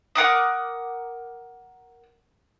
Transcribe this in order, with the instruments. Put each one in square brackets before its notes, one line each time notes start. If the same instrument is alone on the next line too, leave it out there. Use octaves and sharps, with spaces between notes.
[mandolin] A#4 F#5 D6 D#6